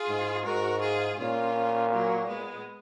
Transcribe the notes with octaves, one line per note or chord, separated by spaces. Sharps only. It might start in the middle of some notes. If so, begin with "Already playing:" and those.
Already playing: F4 G#4
G#2
G#2 F#4 A#4
F4 G#4
A#2 C#4 F4
F#3 A#3
G#3 B3